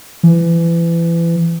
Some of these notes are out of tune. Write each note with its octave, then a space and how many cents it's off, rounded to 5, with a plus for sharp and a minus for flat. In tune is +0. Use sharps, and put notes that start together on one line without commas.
E3 +30